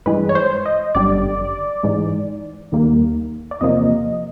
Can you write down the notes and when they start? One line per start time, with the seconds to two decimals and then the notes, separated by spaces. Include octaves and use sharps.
0.06 G2 E3 G#3 B4
0.29 C#5
0.35 C5
0.66 D#5
0.95 G1 F#2 D3 G3 D5
1.83 G#2 E3 G#3
2.72 D#2 D#3 G3 A#3
3.51 D5
3.61 E2 C3 F3 A#3 D#5